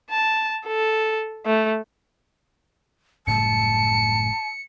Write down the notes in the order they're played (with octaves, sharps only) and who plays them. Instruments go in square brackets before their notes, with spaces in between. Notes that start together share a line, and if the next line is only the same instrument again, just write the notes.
[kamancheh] A5
A4
A3
[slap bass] F#1 A2 G3 [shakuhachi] A5 [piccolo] C#7